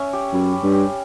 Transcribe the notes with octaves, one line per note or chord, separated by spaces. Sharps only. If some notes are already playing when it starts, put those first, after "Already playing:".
Already playing: C#4 C#5 E5
G4
F#2 B4
G4
G2
G4